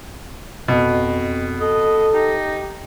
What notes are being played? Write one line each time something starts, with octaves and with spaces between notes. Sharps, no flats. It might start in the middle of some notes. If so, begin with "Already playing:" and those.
F2 B2
A4 D#5
D#4 G4